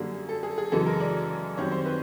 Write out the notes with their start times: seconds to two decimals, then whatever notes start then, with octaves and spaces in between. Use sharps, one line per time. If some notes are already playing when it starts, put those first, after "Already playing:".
Already playing: F#2 D3 G3 A#3 G#4
0.29 A4
0.43 G#4
0.58 G#4
0.72 F#2 C#3 E3 G#3 A4
0.86 A#4
1.00 D5
1.57 F#2 D#3 G3 C4 C#5
1.72 C5
1.86 B4